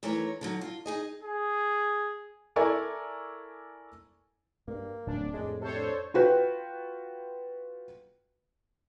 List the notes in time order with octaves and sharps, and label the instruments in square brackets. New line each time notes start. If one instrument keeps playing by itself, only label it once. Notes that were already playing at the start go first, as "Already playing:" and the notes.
[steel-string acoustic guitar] D#2 E3 A3 A#4 C#5 A#5
D3 D#3 F#3
F4
D#4 G#4 D#5
[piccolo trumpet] G#4
[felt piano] E4 A4 A#4 D5 G#5 C#6
[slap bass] G2 [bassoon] A#3
[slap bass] D1 F2 A#2 [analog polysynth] D4
[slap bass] F2 A2 [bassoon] G#3
[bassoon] C3 [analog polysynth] A4 C5 C#5
[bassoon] D4
[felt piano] F4 F#4 B4 G5